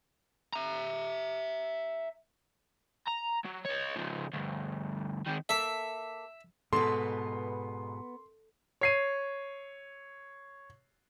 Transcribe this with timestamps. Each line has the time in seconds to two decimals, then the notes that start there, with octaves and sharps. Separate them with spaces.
0.54 E5 A#5
3.07 A#5
3.44 F#3
3.65 C#5 D#5
3.96 C#3 F3
4.33 D2 G2
5.26 D#3 C4
5.49 A#3 A4 E5
6.73 G#2 B2 B3 A4 B4 C6
8.81 C#5 C7 D#7